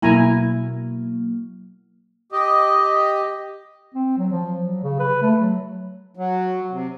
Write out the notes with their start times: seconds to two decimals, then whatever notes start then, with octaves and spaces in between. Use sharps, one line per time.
0.02 B2 F#3 A#3 E4 G#5 A#5
2.32 G4 D#5
3.95 C4
4.18 F#3
4.32 F3
4.64 F#3
4.84 C#3
5.00 B4
5.22 A3
5.40 F#3
6.15 F#3
6.71 C3